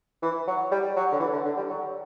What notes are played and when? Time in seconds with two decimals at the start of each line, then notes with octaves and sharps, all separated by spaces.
0.22 E3
0.47 F#3
0.71 G3
0.96 F#3
1.12 D3
1.20 E3
1.33 D3
1.45 D3
1.57 G3
1.69 F#3